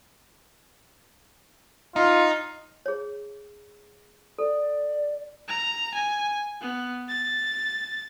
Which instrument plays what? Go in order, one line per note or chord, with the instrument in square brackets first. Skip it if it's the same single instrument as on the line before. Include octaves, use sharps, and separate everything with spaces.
[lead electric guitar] D#4 [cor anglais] F4
[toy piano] G#4 C#5
[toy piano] A4 [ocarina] D5
[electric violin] A#5
G#5
B3
A6